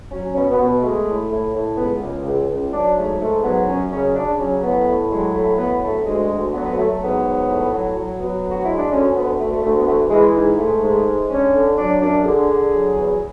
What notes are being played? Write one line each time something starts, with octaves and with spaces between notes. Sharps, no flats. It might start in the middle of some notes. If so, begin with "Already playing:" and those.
F#3 C#4
B2 C#4
B3
B2
G#3 A3
A2
A2
A2
C#2 B3
C#2
C#2
C#2
F#3 D4
G#2 A3
G#2 A3
F#3 B3
F#2 C#4
C#3 C#4
C#3 D4
F#3 C#4
A2 B3
A2
F#3 G#3
A2 A3
F#3 B3
D2 A3
D2 G#3
D2
F#3 B3
B3
F#3 A3
A3
G#2 B3
F#3
A2
F#3
F#3
F#3 B3
D2
F#4
G#3 E4
D4
D2 C#4
D2 B3
D2 A3
A3
D2 A3
B3
E3 A3
E3 G#3
G#2
G#2 A3
G#2
G#3
D3 C#4
D3
F#3 D4
F#2 D4
D3 G#4
D3
F#3
E2